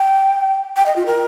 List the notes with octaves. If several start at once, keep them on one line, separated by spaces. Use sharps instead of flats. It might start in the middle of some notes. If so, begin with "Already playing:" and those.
Already playing: G5
G5
D#5
F4
A#4